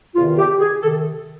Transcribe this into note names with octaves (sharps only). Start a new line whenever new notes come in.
E2 C3 D#3 F4
G4
G#4
C3 D#3 A4